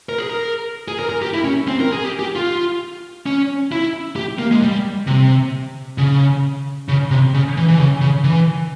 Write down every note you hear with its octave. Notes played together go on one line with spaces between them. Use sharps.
A#4
G#4
A#4
G#4
A#4
A#4
G4
E4
C#4
C4
A#4
G#4
G4
G4
F4
C#4
E4
G4
A#3
G#3
G3
C3
C#3
C#3
C3
C#3
E3
E3
C#3
C#3
E3